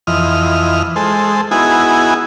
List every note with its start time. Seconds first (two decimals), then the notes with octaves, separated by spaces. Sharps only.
0.07 F2 E3 D#5 F6
0.96 G#3 A4 C5
1.51 B3 D#4 E4 F#4 G#4 G#5